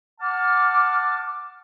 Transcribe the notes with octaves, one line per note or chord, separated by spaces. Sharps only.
F#5 A5 D6 F6